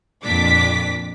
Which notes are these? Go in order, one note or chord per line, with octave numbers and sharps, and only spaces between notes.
F2 A#2 D4 D6 B6